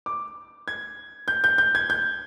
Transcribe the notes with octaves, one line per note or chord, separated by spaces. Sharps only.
D6
G#6
G6
G6
G6
G#6
G6